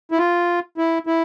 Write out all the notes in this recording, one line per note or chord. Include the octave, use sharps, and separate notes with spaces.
E4
F4
E4
E4